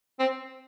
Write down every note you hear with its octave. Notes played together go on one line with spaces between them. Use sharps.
C4